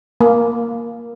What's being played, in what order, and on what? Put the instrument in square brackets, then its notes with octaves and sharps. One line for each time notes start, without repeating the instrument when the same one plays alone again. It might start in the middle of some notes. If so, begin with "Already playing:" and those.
[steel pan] A#3